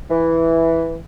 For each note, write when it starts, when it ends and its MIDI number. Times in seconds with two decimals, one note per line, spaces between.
0.10 0.96 52